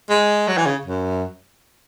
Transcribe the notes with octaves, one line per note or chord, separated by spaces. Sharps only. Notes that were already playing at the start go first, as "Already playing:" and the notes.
G#3
F#3
E3
C#3
F#2